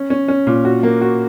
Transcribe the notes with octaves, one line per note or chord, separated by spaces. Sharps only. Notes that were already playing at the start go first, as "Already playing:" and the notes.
Already playing: C#4
C#4
C#4
A#2
F#4
A#3
F#4